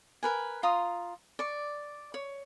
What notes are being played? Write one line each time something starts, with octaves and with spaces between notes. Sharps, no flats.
A#4 B4 G#5
F4 A#5 C6 D#6
D5 C#6
C#5